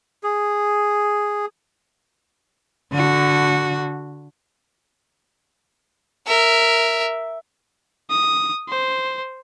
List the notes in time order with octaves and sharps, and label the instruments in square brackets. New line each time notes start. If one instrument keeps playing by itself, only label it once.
[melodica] G#4
[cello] D3 F#4
[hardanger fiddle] A#4 E5
[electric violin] D#6
C5